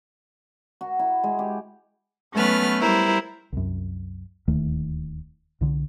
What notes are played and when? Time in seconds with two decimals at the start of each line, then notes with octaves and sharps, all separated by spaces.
0.81 F#4
0.99 E4
1.24 G#3
1.39 G4
2.35 F#3 A3 B3 C#4 B4 F6
2.80 G3 E4 A#4 C5
3.53 C2 F#2
4.48 D1 D#2 D#3 A3
5.61 C2 D3